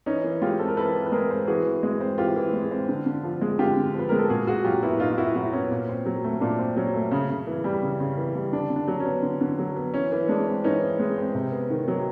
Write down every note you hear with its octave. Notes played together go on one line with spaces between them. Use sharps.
E3 C#4 D#4
E3
G#3 F4 G4
C4 A4
A#4
E3 A4 B4
E3
B4
G#3 G#4 A#4
C4
E3 F#4 G#4
E3
G#3
C4
E3 F4 G4
E3
G#3
C4
D3
D3
F3
G#3
D3 F4 G4
D3
F3 B4
G#3 A#4
A4
A#2 F#4 G#4
A#2 F#4 G#4
F#3 F4 G4
B3 E4 F#4
A#2 D#4 F4
F4
A#2 E4 F#4
F#3 E4 F#4
B3 C#4
A#2
C4
F#3
A3
A#2 D4
C4
F#3 C#4
A3
C#3
C#3
E3
G3
C#3
C#3
E3
G3
D3 D4
D3
D4
F#3
C#4
B3
D3
D3
F#3
B3
E3 C#4
E3
G#3 D4
C4
E3 C#4 D#4
E3
G#3
C4
C3
B3
D#3
F#3